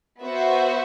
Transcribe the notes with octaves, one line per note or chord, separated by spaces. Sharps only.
B3 F#4 C5 E5